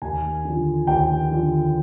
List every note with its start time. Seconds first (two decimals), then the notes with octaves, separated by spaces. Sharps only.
0.02 D#2 G#5
0.45 D3 F3
0.87 D#2 G5
1.31 D3 F3